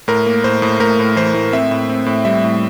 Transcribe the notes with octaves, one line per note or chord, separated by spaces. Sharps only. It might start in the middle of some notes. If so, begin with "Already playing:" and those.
A2 A#4
A#3
A2 C5
A2
A2 A#4
A2
E3 C5
A2
C4 E5
A2
C4
A2
G3 E5
A2